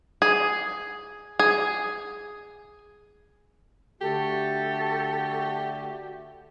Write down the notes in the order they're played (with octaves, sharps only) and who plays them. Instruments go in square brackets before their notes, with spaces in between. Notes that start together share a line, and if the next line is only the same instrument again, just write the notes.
[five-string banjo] G#4
G#4
[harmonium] D3 A3 F#4 [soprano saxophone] G4 [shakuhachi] A4